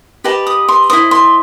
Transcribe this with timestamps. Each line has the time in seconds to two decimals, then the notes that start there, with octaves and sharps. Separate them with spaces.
0.24 G4 B4 D#5 A5
0.47 D#6
0.68 C6
0.90 E4 A4 C5 D#5 D#6
1.11 C6